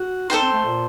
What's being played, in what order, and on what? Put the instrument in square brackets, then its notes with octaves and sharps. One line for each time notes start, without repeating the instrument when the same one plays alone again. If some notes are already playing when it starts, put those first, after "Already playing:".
Already playing: [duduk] F#4
[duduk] D#4 [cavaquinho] A4 C5 G5 C6
[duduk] C4
A3
A#2